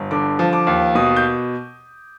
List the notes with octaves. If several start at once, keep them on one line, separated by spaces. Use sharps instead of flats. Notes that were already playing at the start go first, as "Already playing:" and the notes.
Already playing: G1
D3 D6
F3
D6
D#2
B2 D#6
G6